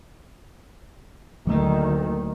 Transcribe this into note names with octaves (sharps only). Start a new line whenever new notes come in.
D2 D#3 F#3 A3 A#3